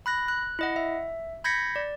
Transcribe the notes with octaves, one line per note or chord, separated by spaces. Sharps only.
B5 F#6 A#6
F#6
E4 D#5 F#5
E5
B5 G6 G#6 A#6 B6 C#7
D5